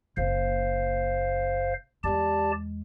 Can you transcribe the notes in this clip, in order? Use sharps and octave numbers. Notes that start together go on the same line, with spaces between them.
F#1 A#3 C5 F5
E2 G#3 G4 D5 A5